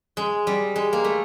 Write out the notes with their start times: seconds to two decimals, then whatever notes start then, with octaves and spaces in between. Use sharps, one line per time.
0.17 G#3
0.47 G3
0.76 G#3
0.93 A#3
1.04 A3